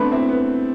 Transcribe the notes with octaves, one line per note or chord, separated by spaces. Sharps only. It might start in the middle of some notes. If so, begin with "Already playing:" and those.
Already playing: A3 B3 C4 D4 C5 B5
C4 E4
B3